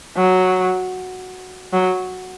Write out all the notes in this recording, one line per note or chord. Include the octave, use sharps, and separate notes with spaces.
F#3
F#3